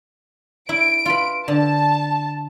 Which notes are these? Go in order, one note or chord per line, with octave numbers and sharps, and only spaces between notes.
E4 D7
F4 B4
D3 A5